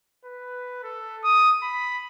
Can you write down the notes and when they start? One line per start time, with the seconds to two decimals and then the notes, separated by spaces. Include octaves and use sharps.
0.25 B4
0.83 A4
1.24 D#6
1.63 B5